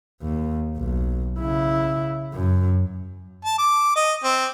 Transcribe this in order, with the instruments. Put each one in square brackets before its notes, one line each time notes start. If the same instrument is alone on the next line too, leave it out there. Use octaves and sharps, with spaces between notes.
[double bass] D#2
B1
C#3 E4
F#2
[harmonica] A5
D6
D#5
C4